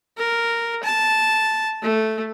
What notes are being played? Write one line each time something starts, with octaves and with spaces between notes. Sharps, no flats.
A#4
A5
A3